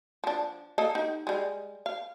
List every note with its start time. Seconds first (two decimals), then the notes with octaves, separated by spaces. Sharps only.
0.24 F3 D4
0.78 A#3 A4 D#5
0.95 D#4 G4
1.27 G3 G#3
1.86 F5